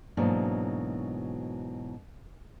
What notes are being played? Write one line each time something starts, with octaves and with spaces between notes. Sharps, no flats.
G#2 B2 E3 F#3 A#3 D4